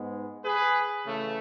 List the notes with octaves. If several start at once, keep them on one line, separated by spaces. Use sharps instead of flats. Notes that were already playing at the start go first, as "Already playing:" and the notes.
Already playing: G#2 G#3 B3
G#4 B4
C#3 E3 A3